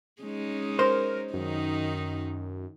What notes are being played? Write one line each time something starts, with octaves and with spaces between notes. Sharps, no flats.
G#3 C#4 D#4
A#4 C5
F#2 D#3 D#4